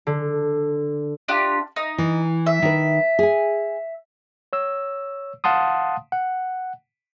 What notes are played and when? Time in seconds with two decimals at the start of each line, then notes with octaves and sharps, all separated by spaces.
0.07 D3
1.28 D4 F4 G4
1.76 D#4
1.98 E3
2.46 E5
2.62 D#3 B4
3.19 G#4 G#5
4.53 C#5 E6
5.44 F5 F#5 A5 C6 D#6
6.12 F#5